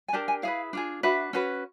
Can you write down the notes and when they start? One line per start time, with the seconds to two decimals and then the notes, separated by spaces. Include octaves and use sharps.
0.08 G#5
0.13 D4 G4 A#4 A5
0.28 G#5
0.43 E4 G#4 B4 F5
0.73 D4 F4 G#4
1.03 D4 F#4 B4 E5
1.33 C#4 F#4 B4